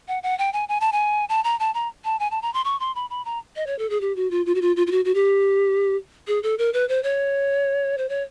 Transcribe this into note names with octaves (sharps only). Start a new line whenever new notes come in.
F#5
F#5
G5
G#5
G#5
A5
G#5
A5
A#5
A5
A#5
A5
G#5
A5
A#5
C6
C#6
C6
B5
B5
A#5
D#5
C#5
A4
G#4
G4
F#4
F4
F4
F#4
F4
F4
F4
F#4
F#4
G4
G#4
A4
A#4
B4
C5
C#5
C5
C#5